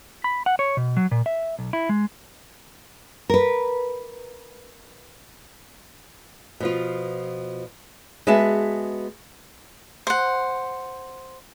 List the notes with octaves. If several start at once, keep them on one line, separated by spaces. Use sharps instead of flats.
B5
F#5
C#5
B2
F#3
A#2
E5
B1
E4
G#3
A#4 B4
B2 F3 F4
G#3 B3 F#4 G#4 E5 A5
C5 F#5